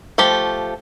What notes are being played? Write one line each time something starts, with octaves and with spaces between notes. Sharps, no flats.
F3 A3 G4